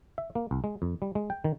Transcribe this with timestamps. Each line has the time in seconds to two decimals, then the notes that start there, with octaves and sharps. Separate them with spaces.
0.18 E5
0.35 A#3
0.51 C2
0.64 G#3
0.82 F2
1.02 G3
1.15 G#3
1.30 G5
1.44 D#3